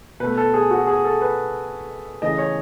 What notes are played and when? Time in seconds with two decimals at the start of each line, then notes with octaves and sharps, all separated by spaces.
0.20 B2 A3 B4
0.37 A4
0.54 G#4
0.71 F#4
0.87 G#4
1.05 A4
1.22 B4
2.21 C#3 E3 A3 D#5
2.38 C#5